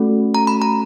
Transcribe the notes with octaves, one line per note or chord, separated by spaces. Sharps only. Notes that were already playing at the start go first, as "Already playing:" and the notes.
Already playing: A3 C#4 F#4 A4
A#5
B5
A#5